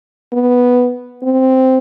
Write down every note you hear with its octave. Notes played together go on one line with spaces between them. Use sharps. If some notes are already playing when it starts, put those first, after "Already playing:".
B3
C4